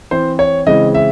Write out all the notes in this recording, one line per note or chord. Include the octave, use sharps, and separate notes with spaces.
E3 C4 C5
C#5
C#3 E3 G#3 C4 D#5
E5